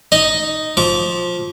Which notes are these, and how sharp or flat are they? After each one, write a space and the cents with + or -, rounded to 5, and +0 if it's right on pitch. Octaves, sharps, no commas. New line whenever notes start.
D#4 +0 D#5 +0
F3 +15 D6 -40